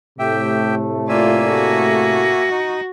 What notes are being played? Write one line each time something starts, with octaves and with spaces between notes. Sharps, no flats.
A2 C3 A3 G4 E5 G5
A#3 F4 D5 E5 G#5
F#4
D#4 D#5